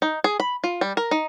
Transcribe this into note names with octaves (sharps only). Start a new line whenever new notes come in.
D#4
G#4
B5
F4
G3
A#4
D#4